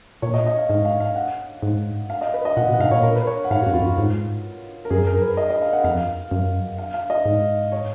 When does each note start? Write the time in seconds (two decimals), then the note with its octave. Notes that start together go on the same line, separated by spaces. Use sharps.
0.22 A#2 C#5
0.34 D#5
0.47 D#5
0.58 F5
0.69 G#2 F5
0.85 F5
1.00 F5
1.16 F#5
1.63 G#2
2.10 F5
2.21 D#5
2.34 B4
2.45 D#5
2.57 A#2 F#5
2.69 B2
2.74 F#5
2.80 G#2 F5
2.91 A#2 C#5
3.03 A#4
3.15 B4
3.27 C#5
3.44 F#5
3.51 G#2 F5
3.62 F#4
3.66 F#2
3.73 F2 F4
3.82 F#2
3.86 F4
3.98 G#2
4.85 A#4
4.91 F#2 G#4
5.07 A#4
5.22 B4
5.37 D#5
5.50 D#5
5.62 F5
5.73 F#5
5.84 F2 F5
6.31 F#2
6.78 F5
6.94 F5
7.10 D#5
7.25 G#2
7.72 C#5